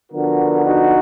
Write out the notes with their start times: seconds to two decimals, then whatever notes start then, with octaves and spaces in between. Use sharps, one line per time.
0.12 D3 F3 B3 F#4 A#4
0.65 D#4 F#4